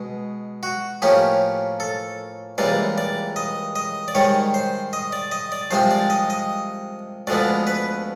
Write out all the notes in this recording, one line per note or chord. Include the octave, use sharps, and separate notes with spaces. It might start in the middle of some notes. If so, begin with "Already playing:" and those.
Already playing: B2 G#3
F#4
A2 F3 A#3 C#4 G4
A4
C#2 C3 E3 G3 A#3 D5
D5
D#5
D#5
D5
G#2 D#3 G3 C#5
C5
D#5
D5
D#5
D5
C2 C3 F3 G#3 C4 C5
D5
D#5
D#5
D2 D3 F3 G#3 B3 D5
B4